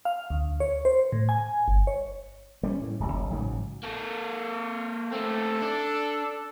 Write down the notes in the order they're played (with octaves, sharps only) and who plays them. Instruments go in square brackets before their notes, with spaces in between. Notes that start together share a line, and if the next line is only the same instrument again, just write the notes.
[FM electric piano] F5
D2
C#5
C5
A2
G#5
G1
C#5
[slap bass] G3 B3 C#4
A2
D1 G#1 C#2 G3
F#1 F#3
A1 G#2 C#3 F#3
[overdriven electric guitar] A#3 A4
[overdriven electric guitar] A3 C4 [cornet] A4
[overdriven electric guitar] D4